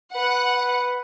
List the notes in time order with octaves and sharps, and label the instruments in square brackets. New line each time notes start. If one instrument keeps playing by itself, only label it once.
[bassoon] B4 [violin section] F#5